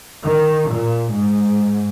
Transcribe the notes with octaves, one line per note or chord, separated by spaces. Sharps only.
D#3
A#2
G#2